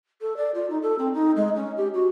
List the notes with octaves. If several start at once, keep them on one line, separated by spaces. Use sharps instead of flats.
A4
D5
F4
D#4
A4
C4
D#4
G#3
C#4
G4
F#4